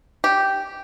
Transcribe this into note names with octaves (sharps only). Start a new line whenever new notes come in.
G4